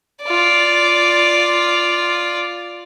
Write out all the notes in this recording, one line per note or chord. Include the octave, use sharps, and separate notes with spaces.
F4 D5